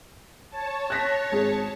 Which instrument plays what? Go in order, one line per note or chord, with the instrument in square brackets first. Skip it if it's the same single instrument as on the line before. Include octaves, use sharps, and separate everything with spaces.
[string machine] C#5 A5
[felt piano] F#6 A#6 B6
G#1 G#4